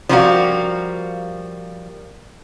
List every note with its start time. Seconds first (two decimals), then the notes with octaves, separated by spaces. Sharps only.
0.09 F3 G3 A#3 D4 F#4 F5